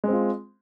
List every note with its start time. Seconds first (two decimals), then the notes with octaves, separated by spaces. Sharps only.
0.04 G#3
0.08 C4
0.13 F4